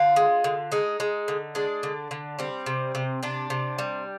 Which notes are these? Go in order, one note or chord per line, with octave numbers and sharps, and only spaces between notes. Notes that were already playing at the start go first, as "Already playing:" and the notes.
Already playing: D3 F4
G#3
D3
G#3 D#4
G#3
D3
G#3 D4
D3
D3
G3 C4
C3
C3
C3 D4
C3
G3